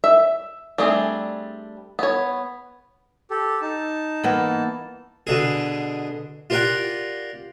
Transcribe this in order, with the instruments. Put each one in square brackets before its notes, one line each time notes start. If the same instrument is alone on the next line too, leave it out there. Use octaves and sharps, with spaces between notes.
[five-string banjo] E5
G3 A3 C4 D4 G#4
B3 C#5
[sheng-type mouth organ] G4 A4
D#4 A5
[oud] E3 A#3 B3
[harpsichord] B2 D3 G#4
F4 G4 A#4 D5 F#5 G5